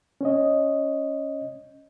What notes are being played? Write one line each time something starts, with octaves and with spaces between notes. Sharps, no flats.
C#4 C#5 D#5